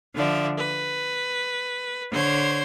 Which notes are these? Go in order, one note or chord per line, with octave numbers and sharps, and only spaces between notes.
D3 F3 D5 E5
B4
D3 C5 C#5 G#6